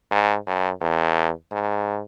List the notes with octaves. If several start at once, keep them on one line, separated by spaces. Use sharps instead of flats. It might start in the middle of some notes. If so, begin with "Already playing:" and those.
G#2
F#2
E2
G#2